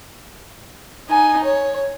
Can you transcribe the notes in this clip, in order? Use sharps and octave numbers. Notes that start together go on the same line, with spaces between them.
D#4 G#5
C#5